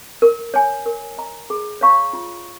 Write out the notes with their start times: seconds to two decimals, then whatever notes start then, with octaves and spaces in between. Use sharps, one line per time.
0.22 A#4
0.54 C#5 G#5
0.86 A#4
1.18 D#5 A#5
1.50 G#4
1.81 C#5 F5 A#5 C#6
2.13 F4